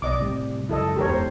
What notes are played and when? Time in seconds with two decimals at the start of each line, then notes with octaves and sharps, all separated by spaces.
0.02 B1 D5 D#5 D6
0.19 A2 C3 G3
0.69 C#2 F#2 E4 A4 D#5
0.96 F#1 E2 G#2 G4 A#4 C#5
1.10 C5